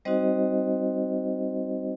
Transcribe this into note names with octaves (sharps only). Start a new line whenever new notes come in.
G3 C4 D#4 F#4 C5 D#5